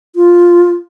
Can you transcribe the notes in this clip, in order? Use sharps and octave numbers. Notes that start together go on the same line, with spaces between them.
F4